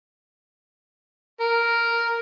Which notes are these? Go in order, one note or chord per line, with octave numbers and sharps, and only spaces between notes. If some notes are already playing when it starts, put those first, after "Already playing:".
A#4